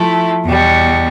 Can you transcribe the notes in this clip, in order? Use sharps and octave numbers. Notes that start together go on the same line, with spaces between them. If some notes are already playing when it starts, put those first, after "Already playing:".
Already playing: F3 A3 E4
E2 B2 G3